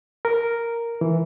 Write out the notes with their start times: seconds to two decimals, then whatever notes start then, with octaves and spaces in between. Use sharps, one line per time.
0.25 A#4
1.01 E3